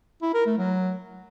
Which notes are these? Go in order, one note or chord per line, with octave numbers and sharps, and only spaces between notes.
E4
A#4
A3
F#3